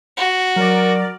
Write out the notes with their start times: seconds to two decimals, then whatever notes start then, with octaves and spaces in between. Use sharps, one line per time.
0.17 F#4
0.56 F#3 A#4 D5